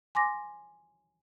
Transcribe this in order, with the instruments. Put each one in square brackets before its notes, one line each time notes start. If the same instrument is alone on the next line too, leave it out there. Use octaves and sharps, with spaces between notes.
[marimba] G#5 C6 D6 A#6